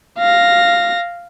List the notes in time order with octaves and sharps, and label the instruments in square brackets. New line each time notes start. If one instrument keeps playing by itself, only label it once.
[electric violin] F5 A#6